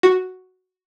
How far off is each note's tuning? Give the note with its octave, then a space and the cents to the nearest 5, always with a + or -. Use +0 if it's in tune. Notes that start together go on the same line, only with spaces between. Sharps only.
F#4 +0